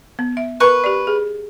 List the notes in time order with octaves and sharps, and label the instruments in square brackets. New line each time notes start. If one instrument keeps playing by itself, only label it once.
[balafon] B3
E5
[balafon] A#4 [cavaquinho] B4 C#6
[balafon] G4 D5
G#4